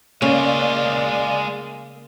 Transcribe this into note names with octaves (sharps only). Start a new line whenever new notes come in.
C#3 G#3 A#3 F4 D5 F5